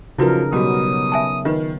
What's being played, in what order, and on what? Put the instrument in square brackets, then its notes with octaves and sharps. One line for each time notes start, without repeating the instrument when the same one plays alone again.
[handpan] C#3 D#4 A#4 [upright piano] F3 F#3 [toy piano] E4 F#4 B4
[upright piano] B2 G3 [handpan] F#3 B3 [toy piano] F#4 G4 [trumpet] D#6
[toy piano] E5 G#5 A5
[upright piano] D#3 [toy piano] F4 B4